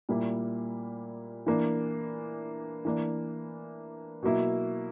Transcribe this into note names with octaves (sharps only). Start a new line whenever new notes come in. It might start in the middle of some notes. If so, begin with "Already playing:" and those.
A#2 G3 A#3 E4
E3 A#3 D4
E3 A#3 D4
B2 F#3 A#3 E4